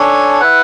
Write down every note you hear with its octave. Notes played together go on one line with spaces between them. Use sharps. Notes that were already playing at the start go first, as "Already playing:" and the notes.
Already playing: D4 A4 C#5 G#5
E4 B4 F#5